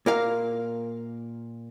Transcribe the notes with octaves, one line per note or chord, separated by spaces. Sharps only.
A#2 A#4 F5